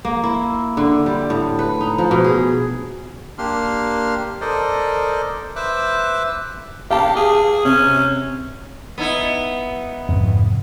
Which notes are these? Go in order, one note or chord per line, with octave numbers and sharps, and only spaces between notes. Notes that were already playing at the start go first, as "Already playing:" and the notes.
A#3
E4
D3
G3
A2
B4
D#4
F3
B2
G#4
A#3 D4 G4 C6 F6
A4 A#4 C5 D5 D#5
B4 C5 E5 D6 E6 F#6
G4 F5 A5
G#4
C3 C#4
B3 D#4 E4
F2 G#2 C3